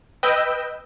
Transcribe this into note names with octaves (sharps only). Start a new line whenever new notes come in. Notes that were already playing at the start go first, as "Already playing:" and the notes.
B4 D#5 G5 E6 G6